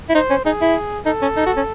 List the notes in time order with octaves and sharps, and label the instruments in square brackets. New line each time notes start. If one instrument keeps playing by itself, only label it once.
[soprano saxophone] E4
[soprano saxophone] D#4 [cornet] C5
[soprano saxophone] C#4
[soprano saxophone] D#4 [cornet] G#4
[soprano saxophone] E4
[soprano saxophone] D#4 [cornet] A4
[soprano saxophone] C#4
D#4
F#4
C#4